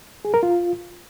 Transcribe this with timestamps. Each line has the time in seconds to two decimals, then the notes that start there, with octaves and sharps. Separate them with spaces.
0.25 G#4
0.34 A#4
0.43 F4